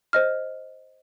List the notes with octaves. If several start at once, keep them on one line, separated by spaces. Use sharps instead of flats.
C5 D#5 F6